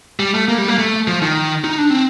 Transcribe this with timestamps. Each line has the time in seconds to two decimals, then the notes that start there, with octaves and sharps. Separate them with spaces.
0.20 G3
0.34 A3
0.48 A#3
0.58 G3
0.68 A#3
0.79 A3
1.07 F3
1.22 D#3
1.64 D#4
1.78 D4
1.90 C4